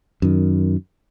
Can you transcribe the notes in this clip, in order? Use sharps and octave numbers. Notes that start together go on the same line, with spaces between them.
F#2 D#3